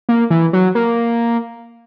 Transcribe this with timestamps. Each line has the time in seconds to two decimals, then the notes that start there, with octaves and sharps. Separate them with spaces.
0.09 A#3
0.30 E3
0.53 F#3
0.75 A#3